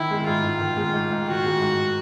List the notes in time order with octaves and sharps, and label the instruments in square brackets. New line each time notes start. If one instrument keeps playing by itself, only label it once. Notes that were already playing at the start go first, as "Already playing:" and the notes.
Already playing: [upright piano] D#3 [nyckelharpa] E4
[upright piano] G#3
[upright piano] G#2 [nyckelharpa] F4
[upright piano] G#2
D#3
G#3
G#2
G#2
[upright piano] D#3 [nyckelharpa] F#4
[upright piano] G#3
G#2